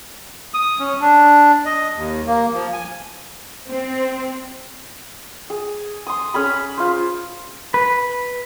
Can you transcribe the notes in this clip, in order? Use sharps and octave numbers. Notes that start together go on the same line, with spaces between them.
D#6
C#4
D4
D#5
D#2
A#3
F3
G#5
C4
G#4
C6 D#6
C#4 G#4 B5
F4 C5
B4